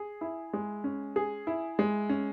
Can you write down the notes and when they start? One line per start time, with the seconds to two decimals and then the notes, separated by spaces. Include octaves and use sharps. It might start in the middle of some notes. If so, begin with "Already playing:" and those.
Already playing: G#4
0.21 E4
0.53 G#3
0.84 C#4
1.16 G#4
1.47 E4
1.79 G#3
2.09 C#4